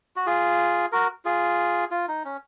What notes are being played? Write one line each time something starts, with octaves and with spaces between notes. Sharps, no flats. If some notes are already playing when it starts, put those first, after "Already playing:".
F#4
F4 G#4
F#4 A#4
F4 G#4
F4
D#4
C#4